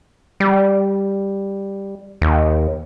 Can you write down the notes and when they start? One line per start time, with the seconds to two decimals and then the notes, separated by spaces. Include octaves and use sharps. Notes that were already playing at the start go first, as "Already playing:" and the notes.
0.40 G3
2.22 D#2